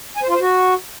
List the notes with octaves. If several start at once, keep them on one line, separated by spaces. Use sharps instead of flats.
G#5
C5
F4
C5
F#4